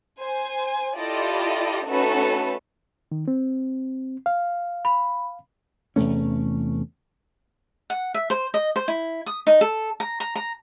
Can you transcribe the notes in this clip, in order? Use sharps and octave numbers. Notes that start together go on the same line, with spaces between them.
C5 G#5
E4 F4 G4 A4 D5 D#5
A3 C#4 D#4 F#4 A4 B4
D#3
C4
F5
B5
E2 C3 A3 C#4
F#5
E5
C5
D#5
C5
E4
D#6
D#4
A4
A#5
A#5
A#5